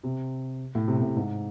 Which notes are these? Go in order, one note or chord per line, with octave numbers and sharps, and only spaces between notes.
C3
A2
C3
C3
A2
G#2